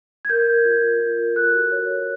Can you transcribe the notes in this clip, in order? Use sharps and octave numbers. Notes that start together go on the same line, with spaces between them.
G#6
A#4 G6
A#4
F4
A#4
F4
A#4
A4 F#6
F#4
C#5
A4